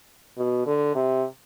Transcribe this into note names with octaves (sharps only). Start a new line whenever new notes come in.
B2
D3
C3